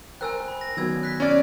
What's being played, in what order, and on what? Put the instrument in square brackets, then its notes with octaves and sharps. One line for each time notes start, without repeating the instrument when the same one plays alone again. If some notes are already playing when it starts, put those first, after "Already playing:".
[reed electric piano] A#4 C5 G5 [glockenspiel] G#5 E6 F#6
[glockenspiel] B5
A#6
[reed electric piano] D#3 F#3 B3 [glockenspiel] G#5 E6 G#6
[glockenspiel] F#6 B6
[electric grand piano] C#4 D5